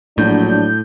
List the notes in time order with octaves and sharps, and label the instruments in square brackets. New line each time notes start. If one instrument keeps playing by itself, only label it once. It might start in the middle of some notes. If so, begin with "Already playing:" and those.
[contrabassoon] A#1 [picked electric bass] A2 [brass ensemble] F#3 D4 [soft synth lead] G6